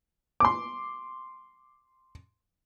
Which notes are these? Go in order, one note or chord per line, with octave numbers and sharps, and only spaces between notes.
C6 D6